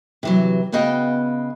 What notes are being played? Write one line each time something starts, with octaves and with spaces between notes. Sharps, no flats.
C3 E3 F#3
C#3 B3 F#4 D#5 F5 G5